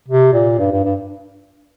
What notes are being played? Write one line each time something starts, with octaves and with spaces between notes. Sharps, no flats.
C3
A#2
G2
G2
G2